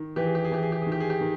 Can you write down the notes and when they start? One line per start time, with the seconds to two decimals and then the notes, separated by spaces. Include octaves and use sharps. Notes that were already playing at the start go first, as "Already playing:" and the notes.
Already playing: D#3
0.16 E3 G4
0.26 G#4
0.35 G4
0.44 G#4
0.51 E3 G4
0.63 G#4
0.72 G4
0.82 G#4
0.86 D#3
0.92 G4
1.00 G#4
1.10 G4
1.21 D#3